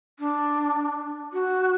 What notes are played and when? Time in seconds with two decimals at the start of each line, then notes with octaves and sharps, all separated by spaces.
0.19 D4
1.33 F#4